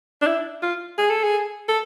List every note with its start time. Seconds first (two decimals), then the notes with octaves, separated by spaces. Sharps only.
0.21 D4
0.27 E4
0.62 F4
0.98 G#4
1.10 A4
1.24 G#4
1.69 A4